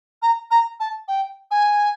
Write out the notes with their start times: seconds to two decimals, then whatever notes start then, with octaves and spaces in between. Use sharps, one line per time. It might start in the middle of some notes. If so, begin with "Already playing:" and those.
0.22 A#5
0.51 A#5
0.80 A5
1.08 G5
1.51 G#5